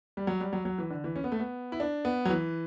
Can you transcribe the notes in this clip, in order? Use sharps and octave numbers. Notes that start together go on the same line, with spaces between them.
G3
F#3
G3
F#3
F#3
E3
D3
E3
C#4
B3
A3
B3
E4
D4
B3
F#3
E3